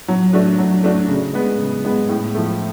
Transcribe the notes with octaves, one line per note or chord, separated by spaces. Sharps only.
F#3
A3 D4 F#4
F#3
A3 D4 F#4
C#3
G#3 B3
C#3
G#3 B3
A2
F3 A3